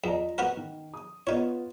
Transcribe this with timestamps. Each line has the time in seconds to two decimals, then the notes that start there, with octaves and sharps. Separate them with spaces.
0.04 E2 F4 D#5 A#5
0.38 B3 F#4 A#4
0.57 D#3
0.94 D#6
1.27 B3 D#4 F4 C#5